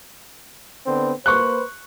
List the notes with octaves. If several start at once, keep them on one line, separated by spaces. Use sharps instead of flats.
D3 B3 C4
A#3 B4 C5 C#6 F#6